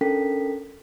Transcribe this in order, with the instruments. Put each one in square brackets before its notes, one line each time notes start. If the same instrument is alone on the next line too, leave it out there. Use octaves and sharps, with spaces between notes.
[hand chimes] C#4 D4 A4 A#4 G5 B6